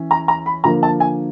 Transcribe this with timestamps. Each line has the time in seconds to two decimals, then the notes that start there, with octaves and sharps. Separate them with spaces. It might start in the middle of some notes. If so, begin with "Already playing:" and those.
Already playing: E3 C#4
0.11 A#5
0.28 A#5
0.46 B5
0.64 D3 F3 A#3 A#5
0.83 A5
1.00 G#5